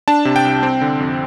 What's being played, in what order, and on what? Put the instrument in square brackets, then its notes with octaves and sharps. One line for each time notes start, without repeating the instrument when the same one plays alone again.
[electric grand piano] D4 A5
C3
G5
C2
C4
D3
F2